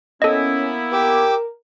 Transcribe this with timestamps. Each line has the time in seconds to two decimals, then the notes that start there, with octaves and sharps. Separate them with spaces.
0.22 A#3 B3 C#4 E4 A4 D#5
0.92 G4 A#4 D6 E6